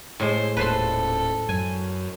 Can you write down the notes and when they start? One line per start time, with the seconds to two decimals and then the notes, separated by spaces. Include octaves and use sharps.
0.20 A2 G#3 C5
0.57 D#1 A4 B4 C5 C6
1.49 F#2 G#5